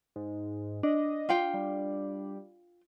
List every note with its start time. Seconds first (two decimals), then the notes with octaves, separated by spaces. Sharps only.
0.16 G#2
0.83 D4 D#5
1.29 F4 F5 G5
1.54 G3